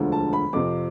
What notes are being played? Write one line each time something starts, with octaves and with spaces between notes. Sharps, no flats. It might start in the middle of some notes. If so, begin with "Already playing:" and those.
Already playing: E1 D2 D3 F3
A5
B5
F2 C3 F3 C4 D6